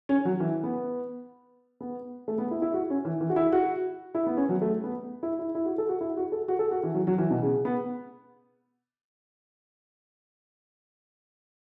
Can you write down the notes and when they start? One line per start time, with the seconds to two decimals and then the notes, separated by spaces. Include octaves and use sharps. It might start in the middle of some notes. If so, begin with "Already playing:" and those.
0.09 C#4
0.25 F#3
0.40 E3
0.64 B3
1.80 B3
2.28 A3
2.38 B3
2.51 E4
2.62 E4
2.74 F#4
2.90 C#4
3.05 E3
3.21 E3
3.29 F#4
3.36 E4
3.52 F#4
4.15 E4
4.26 B3
4.37 C#4
4.49 F#3
4.62 A3
4.84 B3
5.23 E4
5.39 E4
5.55 E4
5.66 F#4
5.78 A4
5.89 F#4
6.01 E4
6.17 F#4
6.32 A4
6.48 F#4
6.59 A4
6.71 F#4
6.83 E3
6.95 F#3
7.07 F#3
7.18 E3
7.30 B2
7.42 C#3
7.65 B3